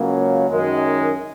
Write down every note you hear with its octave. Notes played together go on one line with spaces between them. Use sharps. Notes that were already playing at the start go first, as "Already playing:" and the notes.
Already playing: C#2 C#3 F#3 A#3
F#2 D#3 G#3